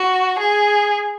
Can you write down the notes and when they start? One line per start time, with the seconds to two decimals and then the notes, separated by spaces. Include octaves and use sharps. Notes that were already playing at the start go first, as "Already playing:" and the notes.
Already playing: F#4
0.39 G#4